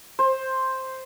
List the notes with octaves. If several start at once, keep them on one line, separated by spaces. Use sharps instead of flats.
C5